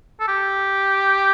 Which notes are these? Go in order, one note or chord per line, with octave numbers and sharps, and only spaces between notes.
A4
G4